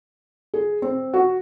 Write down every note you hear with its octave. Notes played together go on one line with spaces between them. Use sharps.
G#4
C4
F#4